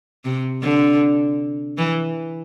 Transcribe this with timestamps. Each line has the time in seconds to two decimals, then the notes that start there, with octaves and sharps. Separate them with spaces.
0.25 C3
0.62 D3
1.78 E3